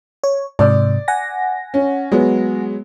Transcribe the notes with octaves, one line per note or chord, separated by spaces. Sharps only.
C#5
G#2 C3 D5
F#5 G#5 A#6
C#4
F#3 G#3 B3